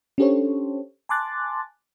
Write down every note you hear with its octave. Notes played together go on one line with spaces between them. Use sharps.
C#4 D4 G4 A4 C5 C#5
G#5 A5 C6 D6 F#6 A6